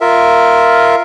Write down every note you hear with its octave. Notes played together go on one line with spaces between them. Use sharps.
F4 A#4 E5